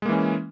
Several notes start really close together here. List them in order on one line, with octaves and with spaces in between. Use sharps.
G#3 A#3 E3 C#4